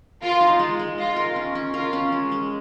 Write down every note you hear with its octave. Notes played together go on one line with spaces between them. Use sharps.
F4 A#4
D#4
G#3
G#3
F4 D#5
A#4
C#4
C#4
F4 A#4
C#4
G#3
G#3